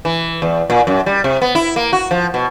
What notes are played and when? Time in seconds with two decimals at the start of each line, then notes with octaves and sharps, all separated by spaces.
0.05 E3
0.42 E2
0.70 A#2
0.87 F#2
1.06 G3
1.24 C3
1.42 B3
1.55 E4
1.76 A#3
1.93 F#4
2.11 F3
2.34 B2